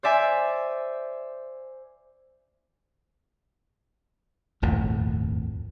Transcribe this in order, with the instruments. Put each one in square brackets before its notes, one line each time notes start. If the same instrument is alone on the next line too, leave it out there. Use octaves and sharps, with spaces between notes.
[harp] C5 D5 E5 G#5
[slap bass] D#1 G#1 F2 A2